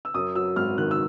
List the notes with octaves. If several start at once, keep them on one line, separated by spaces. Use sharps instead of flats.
E6
F#2 D#6
F#3 E6
G#1 F6
D#3 F#6
E6